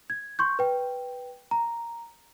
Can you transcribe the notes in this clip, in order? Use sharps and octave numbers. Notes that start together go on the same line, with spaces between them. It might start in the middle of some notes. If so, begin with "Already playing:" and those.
G#6
C6 C#6 G6
B4 G5
A#5